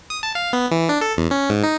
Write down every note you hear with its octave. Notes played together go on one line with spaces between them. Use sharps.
D#6
A5
F5
B3
E3
D4
A4
E2
C#4
G#2
D#4